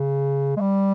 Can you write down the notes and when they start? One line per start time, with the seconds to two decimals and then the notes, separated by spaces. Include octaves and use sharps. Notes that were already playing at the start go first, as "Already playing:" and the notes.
Already playing: C#3
0.57 G#3
0.61 G3